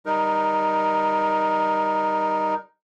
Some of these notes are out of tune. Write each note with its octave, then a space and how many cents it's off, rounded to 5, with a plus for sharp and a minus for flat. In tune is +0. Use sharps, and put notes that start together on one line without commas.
G3 +0 D#4 +0 A#4 +20